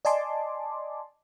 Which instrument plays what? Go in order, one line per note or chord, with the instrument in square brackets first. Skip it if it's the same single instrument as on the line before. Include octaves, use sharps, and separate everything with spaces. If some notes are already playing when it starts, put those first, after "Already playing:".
[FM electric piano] D5 D#5 G#5 A5 C6 D6